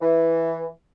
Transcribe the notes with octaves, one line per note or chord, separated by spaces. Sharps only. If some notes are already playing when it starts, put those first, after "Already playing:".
E3